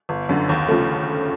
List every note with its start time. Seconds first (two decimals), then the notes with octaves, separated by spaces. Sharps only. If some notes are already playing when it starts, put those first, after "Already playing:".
0.09 G1
0.29 F#2 D3
0.49 D#2
0.68 C#3 F3 A3